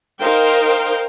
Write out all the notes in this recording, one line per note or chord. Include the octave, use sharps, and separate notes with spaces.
D#4 A#4 C5 F5 G5